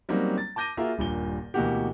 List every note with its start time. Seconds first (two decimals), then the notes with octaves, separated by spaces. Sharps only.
0.09 F#3 G3 A#3 C4 C#4 D#4
0.38 A6
0.56 A5 D6 G6 A#6 D#7 G7
0.77 A#3 F4 F#4 G#4 A#4 E5
0.98 D#1 G2 A#2 G7
1.54 D2 B2 E3 A#3 F#4 G4